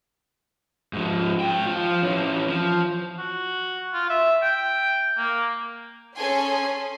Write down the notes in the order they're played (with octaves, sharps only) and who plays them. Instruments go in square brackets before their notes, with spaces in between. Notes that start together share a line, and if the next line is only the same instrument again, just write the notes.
[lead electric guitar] G#2 F3
G#2 G5
F3 F4
E3 C#4
F3
[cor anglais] F#4
F4
E5
G5
A#3
[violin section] C#4 G#4 A4 G#5 C6